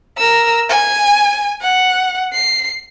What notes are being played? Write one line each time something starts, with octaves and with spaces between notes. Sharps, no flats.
A#4 E6
G#5
F#5
C7